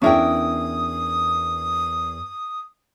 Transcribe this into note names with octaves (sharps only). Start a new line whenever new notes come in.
E2 C#4 D4 E4 A#4 G5 D#6